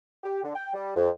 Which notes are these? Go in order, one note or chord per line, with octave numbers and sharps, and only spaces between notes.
G4
D3
G5
G3
F2